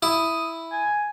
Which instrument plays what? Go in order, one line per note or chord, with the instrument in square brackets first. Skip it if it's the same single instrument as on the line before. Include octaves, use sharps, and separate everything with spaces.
[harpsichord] E4 [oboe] D#6
[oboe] G#5